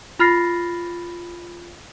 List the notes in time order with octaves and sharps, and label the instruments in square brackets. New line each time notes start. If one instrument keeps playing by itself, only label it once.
[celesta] F4 B5 F6 A6 A#6 C7